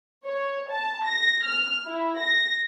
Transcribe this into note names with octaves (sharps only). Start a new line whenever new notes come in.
C#5
A5
A#6
F6
E4
A#6